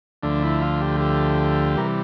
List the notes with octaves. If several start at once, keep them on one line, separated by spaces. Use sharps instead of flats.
D2 D3 F3 A3 D4
E4
F4
G4
G4
C3 E3 G3 A#4